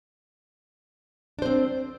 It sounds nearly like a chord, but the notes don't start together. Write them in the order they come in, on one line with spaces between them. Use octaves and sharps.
D4 C5 C4